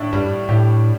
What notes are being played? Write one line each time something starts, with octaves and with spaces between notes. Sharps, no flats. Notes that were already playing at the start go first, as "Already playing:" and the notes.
Already playing: A2 D4
G2 G3
A2 G4